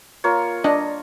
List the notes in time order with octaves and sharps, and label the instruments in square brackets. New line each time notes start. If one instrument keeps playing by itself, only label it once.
[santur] A#3 F4 C#5
[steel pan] D4 D#5